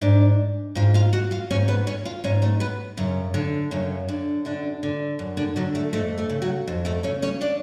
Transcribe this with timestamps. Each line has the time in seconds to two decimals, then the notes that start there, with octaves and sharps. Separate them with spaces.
0.01 G#2 D4 D5
0.75 G#2 F4 F5
0.94 F4 F5
1.13 F#4 F#5
1.31 F4 F5
1.50 G#2 C#4 C#5
1.68 B3 B4
1.87 C#4 C#5
2.05 F4 F5
2.24 G#2 C#4 C#5
2.42 A3 A4
2.60 B3 B4
2.97 F#2 C#3 C#4
3.34 D3
3.71 F#2 C#3 C#4
4.08 D3
4.45 F#2 D3 D4
4.83 D3
5.19 F#2
5.37 D3 D4
5.56 D3 F#3 F#4
5.75 A3 A4
5.93 F2 A3 A4
6.18 A3 A4
6.30 C#3
6.42 F#3 F#4
6.68 F2
6.85 A3 A4
7.03 C#3 C#4 C#5
7.22 C#4 C#5
7.41 D4 D5